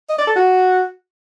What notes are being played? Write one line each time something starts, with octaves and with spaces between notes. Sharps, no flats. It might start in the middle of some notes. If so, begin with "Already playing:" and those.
D#5
D5
A4
F#4